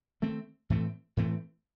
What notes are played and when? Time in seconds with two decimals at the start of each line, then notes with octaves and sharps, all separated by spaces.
0.22 D#3 A3 C4
0.70 A2 E3 A3 C4
1.17 A2 E3 A3 C4